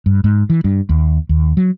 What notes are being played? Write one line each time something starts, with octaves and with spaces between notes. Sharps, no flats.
G2
G#2
E3
G2
D#2
D#2
F#3